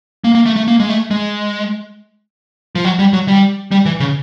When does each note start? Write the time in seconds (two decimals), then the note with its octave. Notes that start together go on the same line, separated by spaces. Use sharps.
0.24 A#3
0.35 A#3
0.46 A3
0.56 A3
0.68 A#3
0.80 G#3
0.89 A3
1.11 G#3
2.75 F3
2.85 F#3
2.99 G3
3.13 F#3
3.28 G3
3.71 G3
3.86 E3
4.00 C#3